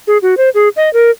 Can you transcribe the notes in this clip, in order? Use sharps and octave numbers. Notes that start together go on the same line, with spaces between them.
G#4
F#4
C5
G#4
D#5
A#4